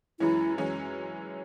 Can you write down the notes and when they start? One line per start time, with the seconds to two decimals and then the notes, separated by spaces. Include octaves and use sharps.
0.20 F#2 E3 G#3 C#4 E4
0.58 F#2 E3 G#3 C#4